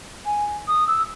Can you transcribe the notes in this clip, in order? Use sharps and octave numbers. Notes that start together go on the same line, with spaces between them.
G#5
D#6
E6